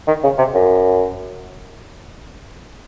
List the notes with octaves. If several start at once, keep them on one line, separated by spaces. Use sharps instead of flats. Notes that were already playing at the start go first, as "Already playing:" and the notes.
D#3
C#3
C3
F#2